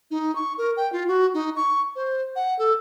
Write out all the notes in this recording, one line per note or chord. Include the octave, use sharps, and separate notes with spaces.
D#4
C#6
A#4
G5
F4
F#4
D#4
C#6
C5
F#5
A4